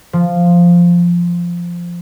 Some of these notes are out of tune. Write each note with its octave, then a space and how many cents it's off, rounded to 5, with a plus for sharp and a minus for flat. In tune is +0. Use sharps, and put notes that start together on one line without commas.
F3 -5